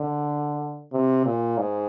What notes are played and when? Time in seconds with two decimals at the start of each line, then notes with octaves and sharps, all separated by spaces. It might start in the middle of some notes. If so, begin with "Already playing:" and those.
Already playing: D3
0.93 C3
1.26 A#2
1.58 G#2